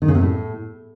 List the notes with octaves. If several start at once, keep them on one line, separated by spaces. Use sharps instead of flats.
D#3
C#3
C3
A2